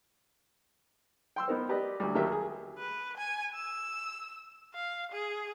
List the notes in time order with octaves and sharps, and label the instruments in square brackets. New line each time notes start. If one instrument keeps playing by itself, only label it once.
[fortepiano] G5 C6 E6
B3 D#4 A#4 C5
G4 B4 D5 D#5
D2 F#3 G3
D#2 F#3 A#3 G4 E5
G#4
[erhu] B4
G#5
E6
F5
G#4